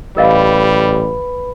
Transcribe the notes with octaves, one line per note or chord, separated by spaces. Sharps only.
A1 G3 A#4 B4 D#5 F5 B5